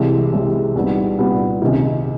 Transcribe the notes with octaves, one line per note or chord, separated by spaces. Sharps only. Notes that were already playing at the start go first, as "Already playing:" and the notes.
Already playing: C2 C3 E3 G#3
C2 C3 E3 G#3
C2 A#2 G3 B3 D#4
C2 A#2 G3 B3 D#4
C#2 C3 D#3